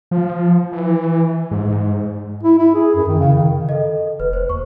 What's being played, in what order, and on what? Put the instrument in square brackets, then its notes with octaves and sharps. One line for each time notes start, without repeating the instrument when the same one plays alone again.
[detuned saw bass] F3
E3
G#2
[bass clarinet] E4
E4
G#4
F#2
D#3
C#3
D#3
[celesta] A4 D#5
[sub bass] F1 [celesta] B4
[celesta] C5
[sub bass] D#2 [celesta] C#6